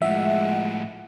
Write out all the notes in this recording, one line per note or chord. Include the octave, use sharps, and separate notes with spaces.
A2 F3 G#3 E5 F#5